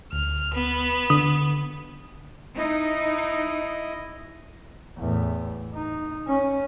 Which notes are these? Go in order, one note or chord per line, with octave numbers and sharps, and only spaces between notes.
D2 F6
B3
D3 D#6
D#4 E4 D#5
E2 A2
D#4
C#4